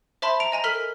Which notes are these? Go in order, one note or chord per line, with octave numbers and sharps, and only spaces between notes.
C5 E5 A5 B5 C6
A#5 D7 F7
D#5 G#5 A#5
A4 A#4 F6 B6 G7